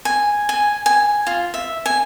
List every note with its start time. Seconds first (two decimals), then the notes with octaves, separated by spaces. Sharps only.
0.05 G#5
0.49 G#5
0.86 G#5
1.27 F4
1.54 E5
1.86 G#5